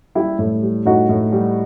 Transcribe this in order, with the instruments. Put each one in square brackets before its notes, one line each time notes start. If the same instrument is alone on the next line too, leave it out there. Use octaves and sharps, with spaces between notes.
[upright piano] G3 E4 G4
A2
G3
A2 D#4 F#4
A2
G3